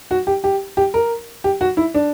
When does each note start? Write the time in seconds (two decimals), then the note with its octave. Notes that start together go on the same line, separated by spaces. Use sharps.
0.11 F#4
0.27 G4
0.44 G4
0.77 G4
0.94 A#4
1.44 G4
1.61 F#4
1.77 E4
1.94 D4